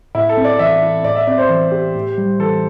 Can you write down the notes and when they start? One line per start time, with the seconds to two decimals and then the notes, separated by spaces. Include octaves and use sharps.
0.15 A2 E4
0.29 A4
0.37 C4
0.44 D5
0.59 E3 E5
0.82 E4
1.04 A2 D5
1.15 E5
1.27 C4 D5
1.38 C5
1.49 E3
1.71 G4
1.95 A2
2.18 G3
2.39 E3 A4